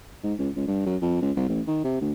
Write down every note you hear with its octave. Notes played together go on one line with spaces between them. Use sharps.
G#2
C#2
C#2
G2
F#2
F2
C#2
C2
A1
D#3
C3
D2